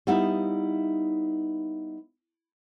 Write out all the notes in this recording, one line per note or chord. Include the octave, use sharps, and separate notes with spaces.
G3 B3 D#4 E4 E5 F5